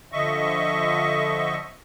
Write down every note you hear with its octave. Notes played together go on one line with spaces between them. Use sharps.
D3 F3 D#5 E5 C#6